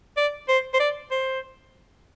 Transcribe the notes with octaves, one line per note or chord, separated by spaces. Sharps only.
D5
C5
C5
D5
C5